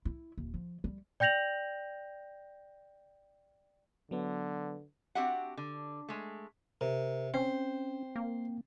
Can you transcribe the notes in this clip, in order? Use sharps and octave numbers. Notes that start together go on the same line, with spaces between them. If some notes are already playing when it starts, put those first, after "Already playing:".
E4
D#1
F3
G3
D5 G5 G6 A#6 F7 F#7
D3 F#3 B3
C4 D4 F#4 G4 E5 F#5
D3
G#3 A3
C3 A#4
C4 C#4 C5 G5
A#3